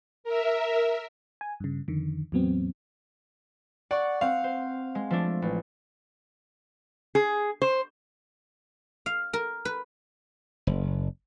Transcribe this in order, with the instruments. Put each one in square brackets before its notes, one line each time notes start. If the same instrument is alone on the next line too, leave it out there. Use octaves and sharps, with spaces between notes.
[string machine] A#4 E5
[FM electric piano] G#5
G2 C#3
F2 D3 D#3
E2 A2 F#3 B3 C4
[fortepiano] D5 [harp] F#5 C#6
[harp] C4 F#5 [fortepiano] F5
[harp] C5
G#3
F3 A3 D4
A1
[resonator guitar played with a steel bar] G#4
C5
[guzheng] F5
A#4
B4
[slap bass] F#1